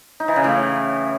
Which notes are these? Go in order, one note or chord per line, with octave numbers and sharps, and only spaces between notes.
D#4
E3
C#3
A2